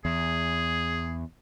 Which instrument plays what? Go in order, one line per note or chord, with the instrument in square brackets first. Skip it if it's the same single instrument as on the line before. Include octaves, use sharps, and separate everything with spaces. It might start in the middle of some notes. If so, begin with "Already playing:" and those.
[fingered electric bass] E2 [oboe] G#4